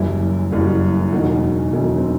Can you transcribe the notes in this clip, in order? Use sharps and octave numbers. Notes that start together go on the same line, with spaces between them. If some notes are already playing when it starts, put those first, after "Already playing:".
Already playing: F#1 F#2 E3 G3 E4
F#1 F#2 E3 G3
E1 E2 D#3 F#3 F#4
E1 E2 D#3 F#3 E4
C4